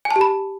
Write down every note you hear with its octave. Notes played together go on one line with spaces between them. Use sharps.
G#5
A5
G4
B5